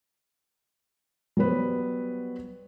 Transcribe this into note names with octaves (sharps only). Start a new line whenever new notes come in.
F#3 G3 B3 B4 C5